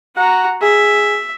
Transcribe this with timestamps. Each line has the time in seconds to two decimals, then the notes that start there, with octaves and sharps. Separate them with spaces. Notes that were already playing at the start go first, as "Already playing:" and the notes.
0.17 F#4 F#5 A#5
0.62 G#4 E5